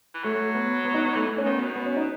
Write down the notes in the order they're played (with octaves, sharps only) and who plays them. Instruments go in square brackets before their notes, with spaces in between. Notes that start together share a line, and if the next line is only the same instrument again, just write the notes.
[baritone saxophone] E3
[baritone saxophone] F#3 [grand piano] A3
[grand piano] B3
B3
D#4
B3
[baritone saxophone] E3 [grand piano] A3
[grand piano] C#4
[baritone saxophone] D#3 [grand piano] B3
[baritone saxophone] B2
[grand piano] B3
C#4
D#4